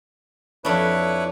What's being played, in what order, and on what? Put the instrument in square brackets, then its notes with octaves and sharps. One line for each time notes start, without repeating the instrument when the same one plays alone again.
[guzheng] F2 D4 [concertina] E4 B4 C#5